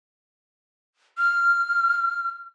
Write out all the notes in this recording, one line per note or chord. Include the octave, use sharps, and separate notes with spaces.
F6